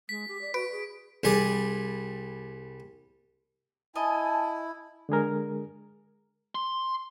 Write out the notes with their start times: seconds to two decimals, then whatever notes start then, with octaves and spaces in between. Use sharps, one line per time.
0.09 G#3 B6
0.28 G4
0.42 D5
0.54 F#4 B4 D7
0.72 G#4
1.24 C2 G3 G#4 D5
3.95 E4 D#5 G#5 A5
5.09 D3 G#3 G#4 A#4
6.55 C6